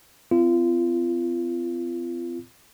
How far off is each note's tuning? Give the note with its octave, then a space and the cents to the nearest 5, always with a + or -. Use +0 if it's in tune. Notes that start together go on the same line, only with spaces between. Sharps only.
C4 -40 F4 -30